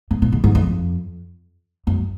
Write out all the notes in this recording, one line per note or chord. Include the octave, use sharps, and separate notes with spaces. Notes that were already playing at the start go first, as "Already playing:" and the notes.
G#2
A#2
G#2
G#2
F2
F#2